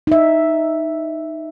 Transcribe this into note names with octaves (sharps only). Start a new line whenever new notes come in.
D#4 E5